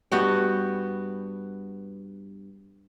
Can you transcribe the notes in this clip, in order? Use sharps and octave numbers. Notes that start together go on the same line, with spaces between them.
G2 B3 F#4 G5